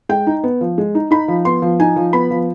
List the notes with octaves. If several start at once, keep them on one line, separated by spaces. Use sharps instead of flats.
G#3 G5
D#4
B3
F3
G#3
D#4
D#4 B5
F3
B3 C6
F3
D#4 G#5
F3
B3 B5
F3